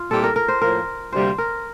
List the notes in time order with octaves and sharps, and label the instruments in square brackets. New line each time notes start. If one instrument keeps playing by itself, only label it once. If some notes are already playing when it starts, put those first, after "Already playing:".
Already playing: [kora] F4
[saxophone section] A#2 G3 C4 E4 G4 [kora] A4
[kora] A#4
A#4
C5
[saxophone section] A2 F3 A#3 [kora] A#4
[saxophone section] D2 C3 G3 A#3 [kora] C5
[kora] A#4